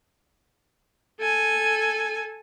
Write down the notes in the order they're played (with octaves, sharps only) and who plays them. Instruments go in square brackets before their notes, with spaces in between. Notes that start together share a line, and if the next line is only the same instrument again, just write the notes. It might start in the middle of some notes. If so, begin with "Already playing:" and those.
[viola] A4 G#5